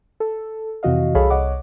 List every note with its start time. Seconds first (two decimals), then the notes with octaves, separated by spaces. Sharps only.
0.20 A4
0.83 F2 C3 E3 F#4 D#5 F5
1.14 C2 G#4 A4 C#5 F5 B5
1.30 C2 C#5 D#5 F#5 D6